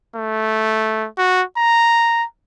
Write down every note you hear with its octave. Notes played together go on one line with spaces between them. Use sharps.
A3
F#4
A#5